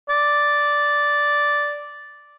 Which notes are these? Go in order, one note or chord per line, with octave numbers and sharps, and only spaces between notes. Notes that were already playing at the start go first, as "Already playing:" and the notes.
D5